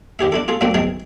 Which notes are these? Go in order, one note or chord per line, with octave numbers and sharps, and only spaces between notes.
D#2 G4 G#4 E5
D4 E4 A4
F4 G#4 A4
A#2 F#3 A3 A#3 C4 D4
B1 C3 D#3 G#4 A#4 A5